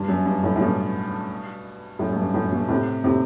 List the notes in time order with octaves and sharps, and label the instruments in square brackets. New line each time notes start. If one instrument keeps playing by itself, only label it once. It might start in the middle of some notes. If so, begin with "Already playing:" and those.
Already playing: [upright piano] G2
F#2
G2
F#2 A2
A2
G2 B2
F#2 A2
F#2
G2
F#2 A2
G2 B2
A2 C3
A2 C3